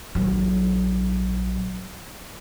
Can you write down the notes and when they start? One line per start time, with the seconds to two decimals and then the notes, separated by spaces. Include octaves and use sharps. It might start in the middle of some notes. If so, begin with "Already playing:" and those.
0.15 A#1 F#3